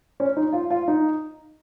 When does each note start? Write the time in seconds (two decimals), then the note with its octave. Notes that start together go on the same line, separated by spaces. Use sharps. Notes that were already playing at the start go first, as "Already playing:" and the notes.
0.20 C#4
0.37 D#4
0.53 F4
0.70 F4
0.88 D#4